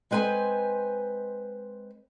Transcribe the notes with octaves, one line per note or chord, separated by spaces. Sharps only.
G#3 C4 B4 C5 G#5